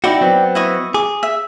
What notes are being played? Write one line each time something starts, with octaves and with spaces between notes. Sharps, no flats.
D#4 E4 F#4 D5 G5
F#3 B3 C4
E4 D#5 C#6
G#4 D6
E5